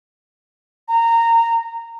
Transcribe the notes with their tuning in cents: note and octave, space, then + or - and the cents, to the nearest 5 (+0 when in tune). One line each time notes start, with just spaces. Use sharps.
A#5 -20